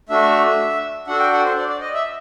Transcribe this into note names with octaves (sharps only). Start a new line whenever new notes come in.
A3 D4 F#4 E5
D4 F#4 A4 F#5
G5
F#5
C5
D5
D5
D#5
E5